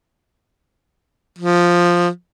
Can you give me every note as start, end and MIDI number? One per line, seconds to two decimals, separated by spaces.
1.39 2.09 53